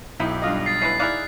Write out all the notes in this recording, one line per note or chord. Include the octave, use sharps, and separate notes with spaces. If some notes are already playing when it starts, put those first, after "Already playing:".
B1 D#4 E4 G4
G2 F4 D#5
A6 C7
C#4 E4 B4 C7
D#4 E4 G#4 D5 F5 F#6